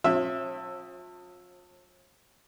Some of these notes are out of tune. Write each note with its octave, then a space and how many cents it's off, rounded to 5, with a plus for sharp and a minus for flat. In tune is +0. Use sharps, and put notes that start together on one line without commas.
F3 +40 C#4 -45 E5 +0